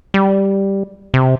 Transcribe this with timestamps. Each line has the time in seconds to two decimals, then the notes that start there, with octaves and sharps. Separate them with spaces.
0.14 G3
1.14 C3